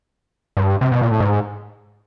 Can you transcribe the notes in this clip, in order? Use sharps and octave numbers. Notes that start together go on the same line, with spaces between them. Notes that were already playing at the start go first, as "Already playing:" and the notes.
G2
C3
B2
A#2
A2
G#2